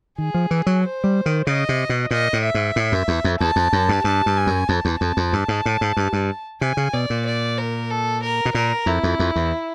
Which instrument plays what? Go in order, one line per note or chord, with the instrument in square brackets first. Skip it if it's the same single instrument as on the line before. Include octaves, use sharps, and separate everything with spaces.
[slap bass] D#3 [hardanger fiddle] G#4
[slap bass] F3
E3
F#3
[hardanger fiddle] C5
[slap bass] G3
D#3
[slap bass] C#3 [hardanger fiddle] D#5
[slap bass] C3
B2
[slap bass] A#2 [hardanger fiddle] D#5
[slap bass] A2
[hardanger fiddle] E5
[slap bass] G#2
A2
F#2
E2
F2
[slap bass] E2 [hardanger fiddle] A5
[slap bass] F2
F#2
G2
[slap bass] G2 [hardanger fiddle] A5
[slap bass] G2
[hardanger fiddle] G#5
[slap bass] F#2
[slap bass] F2 [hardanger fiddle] A5
[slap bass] E2
[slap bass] F2 [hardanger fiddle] A5
[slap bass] F2
G2
G#2
A2
G#2
G2
G2
[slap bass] C3 [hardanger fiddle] G#5
[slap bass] C#3
[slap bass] B2 [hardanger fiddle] D5
[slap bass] A#2
[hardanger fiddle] D5
A#4
A4
A#4
[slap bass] B2
[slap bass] A#2 [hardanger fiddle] A#4
[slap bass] F2 [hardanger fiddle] E4
[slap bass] F2
F2
E2